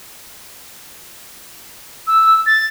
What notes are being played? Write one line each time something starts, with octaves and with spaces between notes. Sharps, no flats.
E6
A6